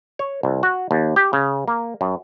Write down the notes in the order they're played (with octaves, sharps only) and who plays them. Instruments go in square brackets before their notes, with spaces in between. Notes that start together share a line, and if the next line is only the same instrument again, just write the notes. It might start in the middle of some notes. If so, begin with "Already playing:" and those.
[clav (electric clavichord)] C#5
C2
F#4
D#2
G4
C#3
A#3
F#2